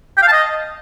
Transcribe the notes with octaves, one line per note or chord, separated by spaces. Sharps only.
G5
F5
A5
D#5